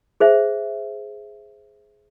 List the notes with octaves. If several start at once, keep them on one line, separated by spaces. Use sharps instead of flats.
G#4 C5 E5